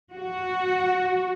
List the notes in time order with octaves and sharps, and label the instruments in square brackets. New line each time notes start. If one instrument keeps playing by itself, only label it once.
[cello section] F#4